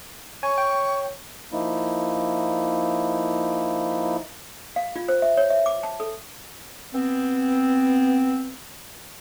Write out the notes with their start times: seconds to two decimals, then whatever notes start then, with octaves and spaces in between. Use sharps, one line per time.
0.43 C#5 G#5 C#6
0.58 G5
1.52 F3 A#3 D#4 E4
4.76 F5
4.96 F4
5.08 C5
5.22 E5
5.37 C#5
5.50 E5
5.66 D6
5.83 A5
6.00 A4
6.94 B3 C4